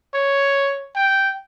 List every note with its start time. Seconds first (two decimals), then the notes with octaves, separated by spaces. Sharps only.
0.14 C#5
0.95 G5